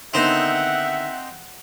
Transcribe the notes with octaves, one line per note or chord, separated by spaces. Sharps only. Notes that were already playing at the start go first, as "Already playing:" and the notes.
D3 D#3 B3 C4 D#4 E5 F#5